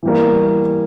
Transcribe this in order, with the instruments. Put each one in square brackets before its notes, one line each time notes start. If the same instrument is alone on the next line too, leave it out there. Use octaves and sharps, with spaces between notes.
[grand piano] E3 G3 A#3